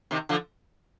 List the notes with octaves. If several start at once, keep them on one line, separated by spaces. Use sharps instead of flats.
C3 D#3
D3 F3